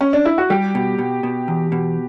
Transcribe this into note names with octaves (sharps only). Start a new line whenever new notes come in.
C#4
D4
E4
F#4
G3 G4
B2
B2
B2
E2
B2